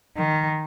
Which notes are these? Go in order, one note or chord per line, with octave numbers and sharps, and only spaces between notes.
D#3